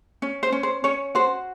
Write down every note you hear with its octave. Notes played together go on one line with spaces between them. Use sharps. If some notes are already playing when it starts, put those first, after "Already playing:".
C#4
C5
C#4
C5
C#4 C#5
F#4 C5